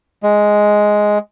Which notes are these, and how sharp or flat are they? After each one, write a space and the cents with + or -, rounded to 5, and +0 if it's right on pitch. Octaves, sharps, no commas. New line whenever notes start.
G#3 +5